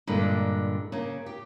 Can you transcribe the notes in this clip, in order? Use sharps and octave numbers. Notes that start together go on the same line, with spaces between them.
G2 A#2 D3 G#3
C#3 A#3
G4